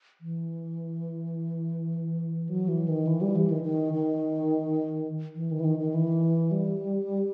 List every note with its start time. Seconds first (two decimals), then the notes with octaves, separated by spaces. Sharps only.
0.21 E3
2.49 F#3
2.68 E3
2.88 D#3
3.07 E3
3.21 G3
3.36 E3
3.50 D#3
3.64 D#3
3.93 D#3
5.36 E3
5.51 D#3
5.60 E3
5.64 D#3
5.79 D#3
5.94 E3
6.51 G3